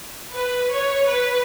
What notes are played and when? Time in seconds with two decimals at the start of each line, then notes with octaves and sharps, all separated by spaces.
0.33 B4
0.71 C#5
1.08 B4